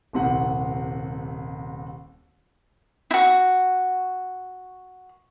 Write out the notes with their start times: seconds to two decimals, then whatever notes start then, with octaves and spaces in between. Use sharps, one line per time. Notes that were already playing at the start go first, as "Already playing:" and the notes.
0.13 D#1 C2 C3 F#5
3.11 E4 F#4